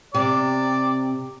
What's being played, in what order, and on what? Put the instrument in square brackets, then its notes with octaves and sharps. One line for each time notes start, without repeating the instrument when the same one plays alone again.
[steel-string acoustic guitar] C3 [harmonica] D5